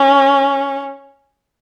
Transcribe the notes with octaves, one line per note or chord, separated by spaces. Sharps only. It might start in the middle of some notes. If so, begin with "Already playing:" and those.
Already playing: C#4